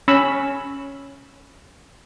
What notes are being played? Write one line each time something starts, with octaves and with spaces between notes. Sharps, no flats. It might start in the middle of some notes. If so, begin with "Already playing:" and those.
C#4 B5 E6